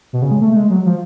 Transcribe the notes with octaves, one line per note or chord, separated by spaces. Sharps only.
B2
C#3
G#3
A3
A3
G#3
F#3
F3